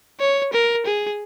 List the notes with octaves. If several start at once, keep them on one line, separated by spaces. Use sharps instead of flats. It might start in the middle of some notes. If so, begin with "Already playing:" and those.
C#5
A#4
G#4